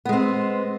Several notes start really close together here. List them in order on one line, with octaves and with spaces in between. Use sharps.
B3 G#3 C4